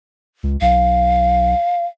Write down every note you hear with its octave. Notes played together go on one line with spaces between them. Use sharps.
C#2
B1 F5